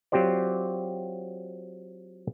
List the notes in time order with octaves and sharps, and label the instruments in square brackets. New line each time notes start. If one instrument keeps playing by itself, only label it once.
[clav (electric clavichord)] F#3 C4 F4 G4 C5 D5